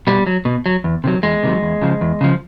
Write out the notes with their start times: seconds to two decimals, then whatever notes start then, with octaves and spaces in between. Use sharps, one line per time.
0.07 B2 G3
0.27 F#3
0.45 B2
0.66 F#3
0.84 E2
1.04 C3 D#3 F#3
1.23 E2 G#3
1.43 C3 D#3 F#3
1.63 E2
1.82 C#3 F3
2.01 E2
2.21 C#3 F3